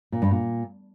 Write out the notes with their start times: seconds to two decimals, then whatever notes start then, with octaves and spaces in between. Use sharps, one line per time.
0.12 A#2
0.22 G2
0.31 A#2